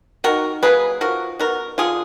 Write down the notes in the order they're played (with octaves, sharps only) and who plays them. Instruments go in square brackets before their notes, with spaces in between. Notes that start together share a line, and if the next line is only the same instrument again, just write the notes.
[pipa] D#3 F#4 A#4
F#3 A#3 G#4 B4
F3 F#4 A#4
B3 F#4 A#4
D3 F4 G#4